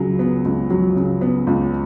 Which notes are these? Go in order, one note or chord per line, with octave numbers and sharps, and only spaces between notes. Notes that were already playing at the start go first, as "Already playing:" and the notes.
Already playing: C#2 C#3 F#3
B3
C#2
F#3
C#3
B3
C#2